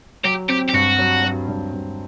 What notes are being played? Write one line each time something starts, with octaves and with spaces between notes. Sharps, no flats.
F#3 G4
C4 G4
G4
G2 F#4
F#3
F#3
G2
G2